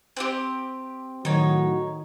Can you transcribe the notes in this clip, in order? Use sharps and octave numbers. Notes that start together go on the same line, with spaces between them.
C4 F#4 G4
A2 D#3 F#3 D#4 F#4 C#5